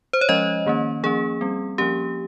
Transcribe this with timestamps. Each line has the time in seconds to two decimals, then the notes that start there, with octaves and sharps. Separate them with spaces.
0.13 C5
0.21 C#5
0.29 F3 G#3 C#4 D#5
0.66 D#3 A#3 C#4
1.03 F3 A#3 C#4 G#4
1.41 G3 C4
1.78 F3 A#3 C#4 G4